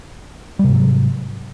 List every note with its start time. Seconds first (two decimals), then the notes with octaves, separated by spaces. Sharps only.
0.59 G3
0.64 C3
0.69 G#2
0.74 F#3